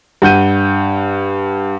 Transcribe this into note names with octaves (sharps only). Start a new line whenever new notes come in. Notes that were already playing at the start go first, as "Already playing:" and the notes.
G2 F#5 G6 D#7